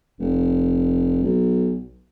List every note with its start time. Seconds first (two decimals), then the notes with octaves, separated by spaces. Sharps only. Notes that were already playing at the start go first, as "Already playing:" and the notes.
0.19 F1
1.23 B1